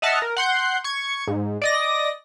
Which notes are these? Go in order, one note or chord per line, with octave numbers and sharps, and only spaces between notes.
D#5 E5 F#5 A5 F6
A#4
F#5 C6 G6
C#6 G#6
G#2
D5 D#5 A#6